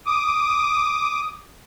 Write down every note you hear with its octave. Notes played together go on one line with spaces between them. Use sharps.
D6 D#6